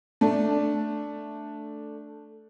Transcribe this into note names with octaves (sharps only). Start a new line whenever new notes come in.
A3 D4